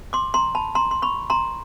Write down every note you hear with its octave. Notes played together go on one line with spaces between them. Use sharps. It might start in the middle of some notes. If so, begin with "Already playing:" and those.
C6 D6
A#5 C6
A5 B5
A#5 C6
C6
B5 C#6
A#5 C6